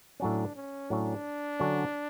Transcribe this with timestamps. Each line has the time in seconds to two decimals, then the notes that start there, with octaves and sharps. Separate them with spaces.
0.20 A2 F#3 C#4 D4
0.55 C#4
0.90 A2 F#3 C#4 D4
1.60 D3 F#3 C#4 F#4